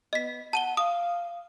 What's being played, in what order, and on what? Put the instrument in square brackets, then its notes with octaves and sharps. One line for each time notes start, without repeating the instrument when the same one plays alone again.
[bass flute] B3 [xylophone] D#5 B6
[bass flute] F#5 [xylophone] A5 D#7 G7
[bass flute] F5 [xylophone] D#6